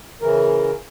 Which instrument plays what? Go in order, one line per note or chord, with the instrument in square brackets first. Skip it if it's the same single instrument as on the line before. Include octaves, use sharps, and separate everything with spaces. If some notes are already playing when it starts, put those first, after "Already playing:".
[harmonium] C#3 E3 A#4